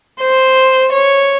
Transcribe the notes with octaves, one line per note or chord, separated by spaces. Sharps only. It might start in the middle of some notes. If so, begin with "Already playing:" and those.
C5
C#5